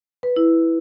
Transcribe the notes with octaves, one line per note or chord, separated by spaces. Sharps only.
B4
E4